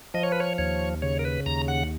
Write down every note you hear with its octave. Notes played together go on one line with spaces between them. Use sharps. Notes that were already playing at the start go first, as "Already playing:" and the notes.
F3 D#5
C#5
B4
C#5
D#2 C#5
C#3 C#5
A#4
B4
D#2 A#5
F#5